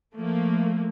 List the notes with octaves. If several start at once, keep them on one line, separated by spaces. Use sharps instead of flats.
F3 A3 A#3